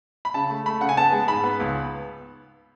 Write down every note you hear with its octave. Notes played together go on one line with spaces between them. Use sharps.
B5
C#3 A5
A3
A3 B5
C#3 F#5
G#5
B3 A5
G#3
G#2 B5
B3
C#2